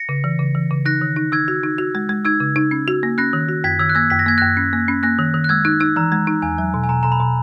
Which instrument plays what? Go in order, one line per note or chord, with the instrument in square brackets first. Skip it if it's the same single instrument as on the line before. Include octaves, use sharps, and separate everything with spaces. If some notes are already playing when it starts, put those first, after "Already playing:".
Already playing: [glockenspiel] A#6 C#7
[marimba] C#3
E3
C#3
E3
C#3
[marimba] D#4 [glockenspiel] F#6 A#6
[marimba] D#3
D#4
[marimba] D#4 [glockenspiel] E6 G#6
[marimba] F#4
D#4
F#4
G#3
G#3
[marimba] D#4 [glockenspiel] E6 G#6
[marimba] C#3
D#4
C#4
F#4
A#3
[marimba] C#4 [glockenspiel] F#6 A#6
[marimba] D#3
F#4
[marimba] F#2 [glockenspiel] G#6 B6
[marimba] D#3 [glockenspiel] E6 G#6
[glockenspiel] F#6
[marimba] A#3 [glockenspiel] E6 G#6
[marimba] F#2 [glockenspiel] B6
[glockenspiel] A#6
[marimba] A#3 [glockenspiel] G#6
[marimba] F#2 [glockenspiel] F#6 A#6
[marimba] C#4
A#3
C#4
[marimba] A#3 [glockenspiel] F#6 A#6
[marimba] D#3
D#3
[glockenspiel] F#6
[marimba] G#3 [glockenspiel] E6 G#6
[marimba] D#4 [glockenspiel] F#6
[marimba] D#4 [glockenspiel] E6
[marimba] E3 [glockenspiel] A#5
[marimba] G#3
D#4
[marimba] E2 [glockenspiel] G#5
[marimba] F#3
B2
[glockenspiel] G#5
[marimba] B2 [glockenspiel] A#5
[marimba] B2 [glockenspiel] A#5
[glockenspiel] B5
[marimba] B2